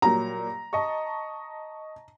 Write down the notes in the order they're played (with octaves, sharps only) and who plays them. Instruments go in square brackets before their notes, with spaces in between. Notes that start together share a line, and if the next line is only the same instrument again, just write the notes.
[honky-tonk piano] A#2 F#3 G3 [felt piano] A#5
[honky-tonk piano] D#5 A5 C#6